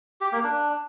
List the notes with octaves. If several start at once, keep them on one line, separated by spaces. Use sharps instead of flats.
G4
A#3
D4